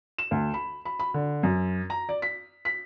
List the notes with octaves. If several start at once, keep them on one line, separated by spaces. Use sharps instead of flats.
E7
D2
B5
B5
B5
D3
F#2
A#5
D5
B6
B6